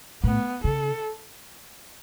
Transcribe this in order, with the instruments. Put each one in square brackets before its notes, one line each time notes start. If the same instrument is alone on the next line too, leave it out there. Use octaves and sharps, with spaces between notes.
[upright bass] A2 [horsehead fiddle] B3
[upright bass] C#3 [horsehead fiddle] A4